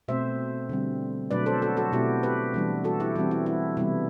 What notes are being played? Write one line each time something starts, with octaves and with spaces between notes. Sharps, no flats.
B2 A3 C4 C5 E5
D3 G3 C4
B2 F#3 A3 D4 B4 D5
A4 C5
F#4 A4
F#4 A4
B2 A3 C4 E4 G4
G4 B4
E3 G3 B3 D4
F#4 A4
E4 G4
E3 G3 C4 F#4
E4
E4
C3 E3 G3 B3 E4